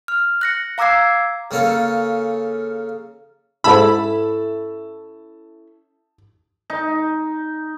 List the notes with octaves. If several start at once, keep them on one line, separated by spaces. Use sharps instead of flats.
F6
F#6 A#6 C#7
F5 A#5 D6 E6 G#6 C7
C#3 A#3 C#4 A4
G#2 C#4 E4 A4 A5 B5 E6
D#4